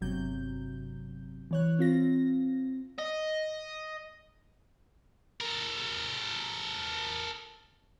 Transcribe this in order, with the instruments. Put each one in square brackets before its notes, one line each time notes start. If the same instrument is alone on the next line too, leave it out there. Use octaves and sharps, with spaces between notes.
[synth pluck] G1 C3 F#3 G6
E3 C#5 F#6
C4 F4 A#6
[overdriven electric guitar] D#5
[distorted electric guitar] A4 A#4